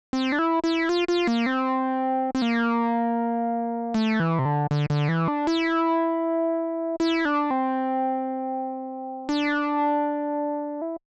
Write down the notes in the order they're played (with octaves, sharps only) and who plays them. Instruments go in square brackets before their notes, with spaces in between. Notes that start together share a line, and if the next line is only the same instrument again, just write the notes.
[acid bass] C4
D4
E4
E4
F4
F4
A#3
C4
C4
A#3
A3
E3
C3
D3
D3
D3
E3
D4
E4
E4
D4
C4
D4
E4